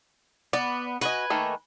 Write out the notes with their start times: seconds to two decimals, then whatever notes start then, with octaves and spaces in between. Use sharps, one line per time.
0.53 B3 D5
1.01 F#4 B4 D#5 G#5
1.30 D#3 A3 A#3